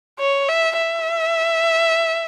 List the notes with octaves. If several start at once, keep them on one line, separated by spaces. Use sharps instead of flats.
C#5
E5
E5